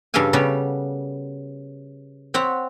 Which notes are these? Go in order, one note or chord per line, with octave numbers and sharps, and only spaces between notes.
G2 C#3 A4 F5 G#5
C#3 G3 B3 C#5
C4 C#5 F#5 B5